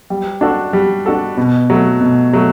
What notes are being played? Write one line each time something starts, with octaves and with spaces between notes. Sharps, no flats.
G3
D4 F#4 A4
G3
D4 F#4 A4
B2
F#3 A3
B2
F#3 A3